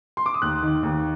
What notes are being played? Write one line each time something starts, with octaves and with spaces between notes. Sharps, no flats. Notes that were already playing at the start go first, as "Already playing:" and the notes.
C6
D6
D#6
D#2 F#6
D#3
D#2